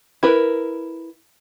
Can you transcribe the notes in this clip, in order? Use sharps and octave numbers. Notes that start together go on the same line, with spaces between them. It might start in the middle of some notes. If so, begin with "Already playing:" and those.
E4 A#4 B4